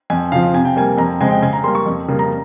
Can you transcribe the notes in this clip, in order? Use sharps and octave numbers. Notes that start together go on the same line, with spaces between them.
F2 G#5
C#3 F3 F5
C3 G#5
G5
G3 A#3 G#5
F2 A#5
C#3 G#3 C4 G#5
G5
C#3 G#5
A#5
G3 A#3 C6
C#6
F2
C#3 G3 A#3
A#5